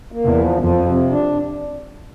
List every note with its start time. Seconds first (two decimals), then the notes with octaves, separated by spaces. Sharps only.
0.12 A#3
0.24 E2
0.37 F3
0.61 F2 F3
0.85 C3
1.10 D4